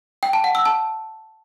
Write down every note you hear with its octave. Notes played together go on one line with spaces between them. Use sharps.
G5
A5
F#5
E6
A5